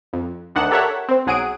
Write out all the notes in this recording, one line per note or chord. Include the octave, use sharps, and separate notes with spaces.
F2
D2 D#3 D4 F#5 E7
G4 A4 A#4 C#5 E5 F#5
C4 C5
B1 F#3 G#4 F#5 D7 D#7